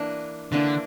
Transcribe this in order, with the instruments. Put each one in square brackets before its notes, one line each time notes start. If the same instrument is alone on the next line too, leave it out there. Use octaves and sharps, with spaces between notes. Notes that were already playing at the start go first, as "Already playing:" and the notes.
Already playing: [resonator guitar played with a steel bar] E3 A#3 D4
[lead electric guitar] D3 [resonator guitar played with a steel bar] E3 A#3 D4